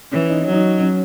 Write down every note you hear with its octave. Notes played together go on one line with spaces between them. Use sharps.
E3 C#4
D#4
C#4
F#3
D#4
C#4